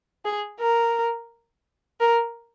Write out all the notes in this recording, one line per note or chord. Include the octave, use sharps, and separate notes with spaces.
G#4
A#4
A#4